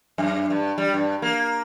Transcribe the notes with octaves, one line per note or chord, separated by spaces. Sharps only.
F#2
G2
G3
G2
A#3